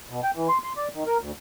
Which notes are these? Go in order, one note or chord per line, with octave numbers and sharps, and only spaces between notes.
B2
G5
E3
C6
C6
D5
D#3
A#4
D2